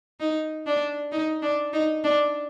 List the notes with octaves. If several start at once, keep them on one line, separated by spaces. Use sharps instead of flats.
D#4
D4
D#4
D4
D#4
D4